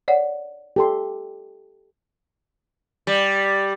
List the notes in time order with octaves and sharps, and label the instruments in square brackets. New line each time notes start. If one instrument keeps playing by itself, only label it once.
[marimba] C#5 D5 F#5
[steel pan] G4 A4 C6
[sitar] G3